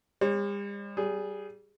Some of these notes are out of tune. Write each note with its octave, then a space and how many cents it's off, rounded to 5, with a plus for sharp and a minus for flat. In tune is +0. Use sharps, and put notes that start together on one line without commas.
G3 +45 C#5 -35
G3 -25 G#4 +0